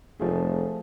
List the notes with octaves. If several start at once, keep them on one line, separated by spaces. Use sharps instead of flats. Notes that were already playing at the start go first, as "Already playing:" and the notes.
F1 F3 A3 G#4